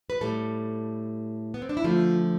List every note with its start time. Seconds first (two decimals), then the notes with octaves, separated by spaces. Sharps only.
0.10 B4
0.21 A2 G3 A4
1.54 B3
1.62 C4
1.69 D4
1.77 E4
1.84 D3 F3 A3 F4